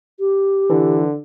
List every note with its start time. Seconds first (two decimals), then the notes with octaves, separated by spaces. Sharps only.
0.19 G4
0.70 D3 E3